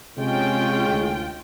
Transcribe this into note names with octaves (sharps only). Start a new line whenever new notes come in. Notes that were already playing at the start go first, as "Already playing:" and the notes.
C3 G#3 C#4 F4 G5
D2